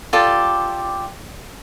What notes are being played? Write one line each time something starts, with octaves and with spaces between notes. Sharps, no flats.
F4 G4 A4 D5